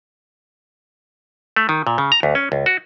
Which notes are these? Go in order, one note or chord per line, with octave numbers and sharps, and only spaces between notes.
A3
D#3
A#2
C#3
A#5
D2
C#4
C#2
F#4